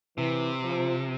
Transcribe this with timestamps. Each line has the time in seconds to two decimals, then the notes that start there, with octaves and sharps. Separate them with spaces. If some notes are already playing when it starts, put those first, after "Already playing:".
0.18 C3 E3
0.62 F3